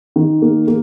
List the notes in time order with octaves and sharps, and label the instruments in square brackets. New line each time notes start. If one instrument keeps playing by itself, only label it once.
[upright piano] D#3
A#3
A#3